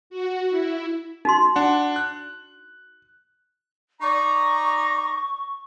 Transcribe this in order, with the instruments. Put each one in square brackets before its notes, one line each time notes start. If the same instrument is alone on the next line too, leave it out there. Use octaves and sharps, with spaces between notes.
[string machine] F#4
E4
[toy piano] D#4 F#4 C6
[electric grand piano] D4 F#5
F#6
[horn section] D#4 D5 A#5 [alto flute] C#6